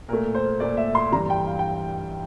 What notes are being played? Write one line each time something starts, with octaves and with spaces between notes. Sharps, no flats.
A#2 A3 A#4
C5
A#2 A3 D5
E5
C6
G2 E3 G3 A#5
G5
F5
G5